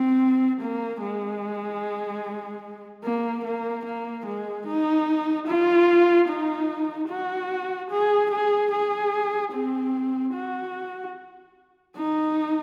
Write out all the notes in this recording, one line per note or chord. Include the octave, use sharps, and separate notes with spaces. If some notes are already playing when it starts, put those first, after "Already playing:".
Already playing: C4
A#3
G#3
A#3
A#3
A#3
G#3
D#4
F4
D#4
F#4
G#4
G#4
G#4
C4
F#4
D#4